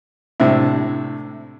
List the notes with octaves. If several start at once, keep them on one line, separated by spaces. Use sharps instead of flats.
A2 C3 D4 E4